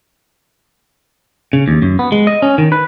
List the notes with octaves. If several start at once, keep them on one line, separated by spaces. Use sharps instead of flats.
C#3
D#2
F#2
B3
G#3
D#5
C#4
D#3
B4